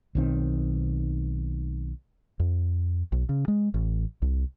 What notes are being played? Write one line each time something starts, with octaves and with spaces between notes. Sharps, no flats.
B1 D#3 C4
F2
B1
C#3
G#3
A1
C2